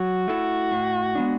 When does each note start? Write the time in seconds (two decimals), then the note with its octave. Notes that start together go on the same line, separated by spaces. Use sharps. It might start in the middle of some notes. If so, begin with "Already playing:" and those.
Already playing: F#3 F#4
0.28 A3 E4 A4
0.72 A2
1.15 G#3 B3 D4